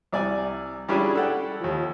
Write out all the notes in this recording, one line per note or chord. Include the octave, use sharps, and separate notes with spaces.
C2 D5 G#5
G3 C#4 D4 E4 F4 G#4
A4 F#5 G5
D#2 F3